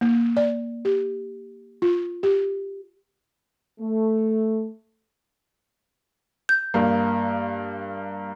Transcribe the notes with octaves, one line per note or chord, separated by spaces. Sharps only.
A#3
D5
G4
F4
G4
A3
G6
G2 A#3